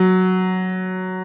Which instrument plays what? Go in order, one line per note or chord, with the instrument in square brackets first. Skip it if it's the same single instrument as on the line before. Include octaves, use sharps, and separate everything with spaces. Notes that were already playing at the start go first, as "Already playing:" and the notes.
Already playing: [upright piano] F#3